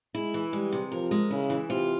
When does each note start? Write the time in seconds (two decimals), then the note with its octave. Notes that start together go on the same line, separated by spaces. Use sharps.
0.15 G#3 E4
0.34 E3
0.53 G3 G#3
0.72 C3
0.92 F3 A#4
1.11 G#3
1.30 C#3 E4
1.50 E3
1.70 C3 F4